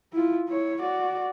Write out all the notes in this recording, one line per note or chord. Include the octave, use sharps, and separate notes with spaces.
E4 F4
E4 C#5
F#4 D5